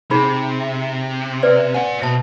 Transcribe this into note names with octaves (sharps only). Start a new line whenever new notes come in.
C3 D#4 G#4 B5
B4 D5
D5 F#5 G#5
B2 E5 A5